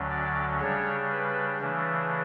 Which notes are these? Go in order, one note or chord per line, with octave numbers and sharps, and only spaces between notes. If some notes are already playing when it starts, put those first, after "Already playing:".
Already playing: D2 D3 F#3 C#4
D5
C#3 G3 D4 C#5
B4
C#3 E3 A3 D4